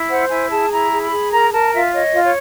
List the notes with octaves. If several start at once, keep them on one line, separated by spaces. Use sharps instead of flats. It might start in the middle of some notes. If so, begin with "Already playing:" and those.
Already playing: E4
C5 F#5
E4 G#5
G#4 A5
E4 A#5
G#4
B5
G#4
A#4 A#5
A#4 A5
F4 E5
C#5 D#5
F4
C#5